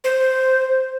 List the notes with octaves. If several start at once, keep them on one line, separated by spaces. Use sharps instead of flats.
C5